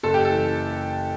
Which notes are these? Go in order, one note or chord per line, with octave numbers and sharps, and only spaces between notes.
F#1 A4
G4
A4
E3